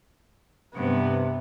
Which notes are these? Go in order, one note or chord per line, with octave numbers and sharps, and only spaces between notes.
G2 C3 B3